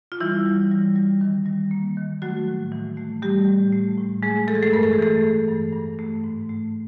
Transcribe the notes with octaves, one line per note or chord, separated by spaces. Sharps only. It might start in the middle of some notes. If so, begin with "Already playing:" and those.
F4
E3 G3 E4
G3
G3
G3
D#3
G3
A#3
D#3
F#3 A3 F#4
A2
E3
A3
G3 A3 G4
A2
A3
A2
G#3 A3 G#4
E3 A4
G#4
A3 A4
G2 A#4
A4
G#4
E3 A3 A4
A3
G2
G2
A3
G#2
A3